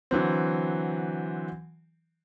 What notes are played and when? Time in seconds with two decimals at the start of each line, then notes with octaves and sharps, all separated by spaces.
0.11 D3 E3 F#3 C4